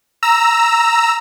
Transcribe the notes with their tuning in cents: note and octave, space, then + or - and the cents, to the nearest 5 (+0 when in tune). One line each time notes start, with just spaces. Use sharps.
A#5 +0 E6 +0